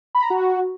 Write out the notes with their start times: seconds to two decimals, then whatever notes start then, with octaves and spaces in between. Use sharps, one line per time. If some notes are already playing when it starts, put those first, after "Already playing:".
0.15 B5
0.22 A#5
0.30 F#4